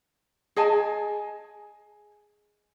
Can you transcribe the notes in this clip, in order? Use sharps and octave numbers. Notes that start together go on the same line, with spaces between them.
G#4 D#5 G#5 A5